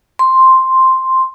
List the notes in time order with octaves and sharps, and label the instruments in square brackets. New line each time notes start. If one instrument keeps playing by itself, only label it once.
[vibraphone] C6